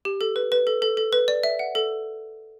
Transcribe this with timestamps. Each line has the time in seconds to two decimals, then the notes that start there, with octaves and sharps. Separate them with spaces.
0.05 G4
0.21 A4
0.36 B4
0.52 B4
0.67 A4
0.82 A4
0.97 A4
1.13 B4
1.28 D5
1.43 E5
1.59 F#5
1.75 A4